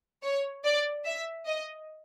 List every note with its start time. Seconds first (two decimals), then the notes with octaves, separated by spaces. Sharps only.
0.23 C#5
0.64 D5
1.05 E5
1.46 D#5